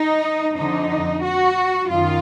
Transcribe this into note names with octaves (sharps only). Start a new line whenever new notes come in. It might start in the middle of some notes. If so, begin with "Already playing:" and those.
Already playing: D#4
F2 D3 D#4
F#4
F#2 D#3 F4